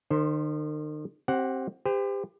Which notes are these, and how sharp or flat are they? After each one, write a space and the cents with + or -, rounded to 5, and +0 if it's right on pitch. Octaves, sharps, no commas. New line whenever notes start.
D#3 -40 C5 +10
C4 +15 G4 -20 F#5 +0
G4 +30 C5 -35